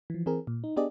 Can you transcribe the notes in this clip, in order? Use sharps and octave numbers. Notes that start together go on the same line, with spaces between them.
E3 F3
E3 C4 G#4 A#4
A#2
D#4
B3 D4 G4 G#4 D5 D#5